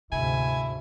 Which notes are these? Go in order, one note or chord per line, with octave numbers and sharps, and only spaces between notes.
D2 G#2 C3 E4 G#5